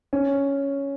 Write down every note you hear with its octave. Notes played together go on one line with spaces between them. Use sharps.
C#4